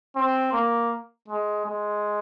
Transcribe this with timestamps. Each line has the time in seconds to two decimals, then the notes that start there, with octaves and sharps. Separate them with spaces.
0.16 C4
0.53 A#3
1.28 G#3
1.66 G#3